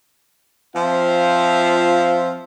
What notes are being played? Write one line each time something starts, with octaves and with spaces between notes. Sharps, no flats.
F3 C4 F4 C5 E5 F5